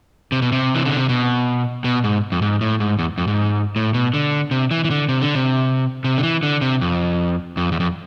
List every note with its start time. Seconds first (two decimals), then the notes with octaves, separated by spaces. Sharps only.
0.32 C3
0.42 B2
0.52 C3
0.74 E3
0.85 D3
0.97 C3
1.09 B2
1.84 B2
2.04 G#2
2.32 F2
2.42 G#2
2.61 A2
2.80 G#2
2.99 E2
3.18 F2
3.27 G#2
3.76 A2
3.94 B2
4.14 D3
4.51 C3
4.71 E3
4.84 E3
4.91 D3
5.09 C3
5.22 D3
5.35 C3
6.04 C3
6.18 D3
6.23 E3
6.43 D3
6.61 C3
6.81 F2
7.57 F2
7.72 E2
7.80 F2